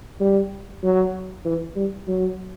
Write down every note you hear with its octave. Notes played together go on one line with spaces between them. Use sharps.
G3
F#3
E3
G3
F#3